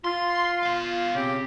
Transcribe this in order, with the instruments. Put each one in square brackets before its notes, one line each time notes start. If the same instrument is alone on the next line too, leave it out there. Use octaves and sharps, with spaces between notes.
[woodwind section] F4 [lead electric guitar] C6
[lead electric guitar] B2 F5
[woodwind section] C#3 C4 G4